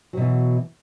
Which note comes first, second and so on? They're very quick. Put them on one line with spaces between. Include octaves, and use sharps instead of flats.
F#3 B2 E3